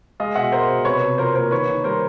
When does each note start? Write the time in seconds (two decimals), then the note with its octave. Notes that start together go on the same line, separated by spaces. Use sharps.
0.20 G#3 D#5 F5
0.35 B2 E5 F#5
0.52 G#3 A#4 C5
0.68 B2
0.85 C3 B4 C#5
1.02 C3
1.18 F3 A#4 C5
1.35 A#3 A#4 C5
1.51 D#3 B4 C#5
1.68 D#3
1.84 G3 A#4 C5